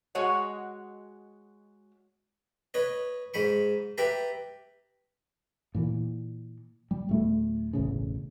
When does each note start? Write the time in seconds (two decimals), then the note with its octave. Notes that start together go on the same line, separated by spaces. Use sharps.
0.15 G#3 F#4 C#5 D#5 F#5
2.74 B4 C#5 D#5
3.34 G#2 D#4 B5 C#6
3.98 G4 B4 E5 A5 A#5
5.75 A#2 E3
6.91 G3
7.09 D1 A3 B3
7.73 E1 A1 E2 C#3